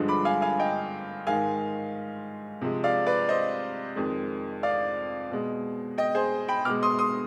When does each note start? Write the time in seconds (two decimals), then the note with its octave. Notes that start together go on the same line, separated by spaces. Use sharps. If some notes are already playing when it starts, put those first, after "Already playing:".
Already playing: G2 D3 F3 G#3
0.08 B5 D6
0.25 F5 G#5
0.42 F5 G#5
0.59 D#5 G5
1.26 G#2 D#3 G#3 F5 G#5
2.61 C3 F3 G#3
2.84 D5 F5
3.07 B4 D5
3.29 C5 D#5
3.96 F2 D#3 G#3
4.63 D5 F5
5.30 B2 G#3
5.98 D#5 G5
6.15 G#4 C5
6.48 G5 B5
6.65 B2 G#3 D6 F6
6.83 C6 D#6
6.99 C6 D#6